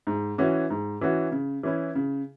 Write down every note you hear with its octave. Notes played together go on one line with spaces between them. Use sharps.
G#2
E3 C#4 F#4
G#2
E3 C#4 F#4
C#3
E3 C#4 E4
C#3